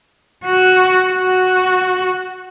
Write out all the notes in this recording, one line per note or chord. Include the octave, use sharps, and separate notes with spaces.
F#4
F#4